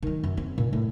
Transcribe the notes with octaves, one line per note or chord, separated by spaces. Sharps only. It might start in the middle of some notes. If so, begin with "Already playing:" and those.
D#3 F#3
F#2
C4
A#2
A2